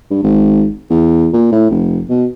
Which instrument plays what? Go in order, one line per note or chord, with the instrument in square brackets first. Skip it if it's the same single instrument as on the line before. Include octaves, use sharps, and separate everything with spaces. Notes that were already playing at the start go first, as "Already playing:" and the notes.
[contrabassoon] G2
G#1
E2
A#2
A2
F1
B2